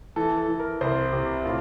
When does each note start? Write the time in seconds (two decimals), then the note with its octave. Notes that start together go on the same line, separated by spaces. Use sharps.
0.16 E3 A4
0.38 A4
0.48 E3
0.60 A#4
0.81 C2 C5
1.13 C3 G4
1.45 A2 F4